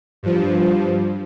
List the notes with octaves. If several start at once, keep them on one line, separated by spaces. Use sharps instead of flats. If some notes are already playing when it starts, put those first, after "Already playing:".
G2 F3